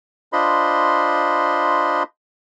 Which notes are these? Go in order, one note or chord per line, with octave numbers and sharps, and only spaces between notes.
D4 F4 C5 D#5 B5 C6